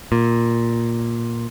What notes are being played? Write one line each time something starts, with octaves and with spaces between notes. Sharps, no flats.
A#2